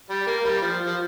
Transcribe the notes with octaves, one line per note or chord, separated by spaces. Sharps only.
G3
A#3
G3
F3
F3